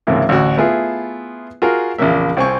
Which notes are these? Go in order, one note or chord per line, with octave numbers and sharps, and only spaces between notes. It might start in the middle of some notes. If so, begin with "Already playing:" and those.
C#2 G#2 C3 E3 A3 A#3
A1 D2 F#4
A3 B3 E4 F4 G#4
F4 F#4 G#4 A#4
A#1 E2 C#3 A#3 E5
C2 C4 G#5 C#6